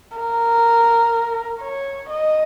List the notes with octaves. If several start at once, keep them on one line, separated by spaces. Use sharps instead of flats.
A#4
C#5
D#5